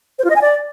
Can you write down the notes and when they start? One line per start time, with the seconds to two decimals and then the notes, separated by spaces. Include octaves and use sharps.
0.19 C5
0.24 F4
0.30 D#5
0.36 G#5
0.42 D5